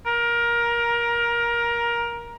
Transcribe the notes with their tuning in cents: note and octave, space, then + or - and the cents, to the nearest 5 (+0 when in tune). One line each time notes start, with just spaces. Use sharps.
A#4 +20